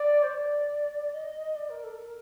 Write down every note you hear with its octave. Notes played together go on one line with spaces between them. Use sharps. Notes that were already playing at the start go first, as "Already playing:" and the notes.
Already playing: D5
C5
D5
D#5
D5
A#4
A4
A#4